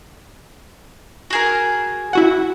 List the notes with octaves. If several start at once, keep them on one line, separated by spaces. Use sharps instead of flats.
F#4 G#4 A#4
E4 F#4 F#5